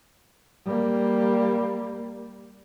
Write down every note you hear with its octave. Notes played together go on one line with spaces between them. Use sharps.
G3 A#3